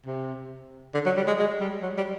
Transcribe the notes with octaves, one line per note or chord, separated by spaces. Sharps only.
C3
D3
F#3
G3
G#3
G#3
G3
F#3
G3